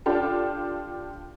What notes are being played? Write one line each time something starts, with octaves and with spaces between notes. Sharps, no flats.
D4 F4 G4 A4